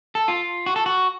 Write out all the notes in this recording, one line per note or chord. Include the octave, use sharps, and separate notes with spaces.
A4
F4
F#4
A4
F#4